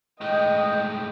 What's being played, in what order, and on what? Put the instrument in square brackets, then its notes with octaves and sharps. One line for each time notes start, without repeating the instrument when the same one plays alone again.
[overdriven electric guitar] A2 G#3 [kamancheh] D#5 [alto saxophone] G5